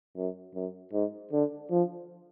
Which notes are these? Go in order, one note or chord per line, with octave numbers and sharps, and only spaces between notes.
F#2
F#2
G#2
D3
F3